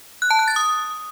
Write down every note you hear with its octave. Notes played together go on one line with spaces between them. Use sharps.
F#6
A5
F#6
A6
D#6